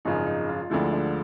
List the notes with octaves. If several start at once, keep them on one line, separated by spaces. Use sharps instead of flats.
G#1 F#2 C#3 F3 D#4
D#4
F4
D2 D3 F3 G#3 E4
D4